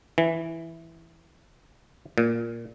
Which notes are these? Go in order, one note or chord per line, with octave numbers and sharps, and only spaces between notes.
E3
A#2